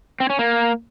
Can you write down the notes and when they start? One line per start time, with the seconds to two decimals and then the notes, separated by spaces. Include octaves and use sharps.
0.20 C4
0.30 C#4
0.39 A#3